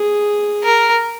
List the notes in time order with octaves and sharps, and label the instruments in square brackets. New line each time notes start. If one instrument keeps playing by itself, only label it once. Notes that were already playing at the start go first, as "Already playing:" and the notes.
Already playing: [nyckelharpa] G#4
[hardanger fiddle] A#4